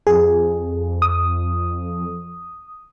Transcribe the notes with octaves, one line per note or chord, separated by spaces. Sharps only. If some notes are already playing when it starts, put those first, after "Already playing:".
F2 G#4
D#6